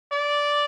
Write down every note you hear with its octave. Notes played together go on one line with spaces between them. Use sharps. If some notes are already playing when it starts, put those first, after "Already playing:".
D5